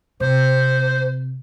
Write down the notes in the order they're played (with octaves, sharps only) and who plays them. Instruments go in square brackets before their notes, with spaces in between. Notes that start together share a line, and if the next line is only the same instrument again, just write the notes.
[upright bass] C3 [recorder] C5